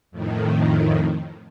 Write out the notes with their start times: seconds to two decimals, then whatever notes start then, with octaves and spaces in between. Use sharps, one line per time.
0.11 F2 A2 D#3